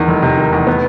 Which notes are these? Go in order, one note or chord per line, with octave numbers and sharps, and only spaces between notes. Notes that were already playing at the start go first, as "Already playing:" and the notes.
Already playing: E2 D#3
F1
C3
D#3
E2
B3